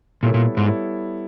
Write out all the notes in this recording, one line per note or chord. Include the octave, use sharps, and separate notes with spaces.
A#2 G3 B3 E4 A4 C#5
A#2
G#2
G3 B3 E4 A4 C#5